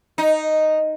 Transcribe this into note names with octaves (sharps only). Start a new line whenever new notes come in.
D#4